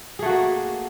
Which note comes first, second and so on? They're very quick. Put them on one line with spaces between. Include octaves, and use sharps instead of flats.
G#4 A3 F#4 A#3